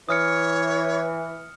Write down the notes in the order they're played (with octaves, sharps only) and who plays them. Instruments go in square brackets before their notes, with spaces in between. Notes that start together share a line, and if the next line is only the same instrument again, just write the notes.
[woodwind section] E3 [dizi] C#5 [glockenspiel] D#6 F6 C#7